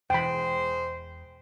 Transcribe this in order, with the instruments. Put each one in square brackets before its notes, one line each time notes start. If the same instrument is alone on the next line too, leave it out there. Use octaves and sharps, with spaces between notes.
[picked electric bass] E1 E2 [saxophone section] G#3 C5 [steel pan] G5 B5